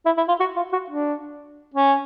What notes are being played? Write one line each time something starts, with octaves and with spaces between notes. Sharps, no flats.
E4
E4
F4
F#4
F4
F#4
D4
C#4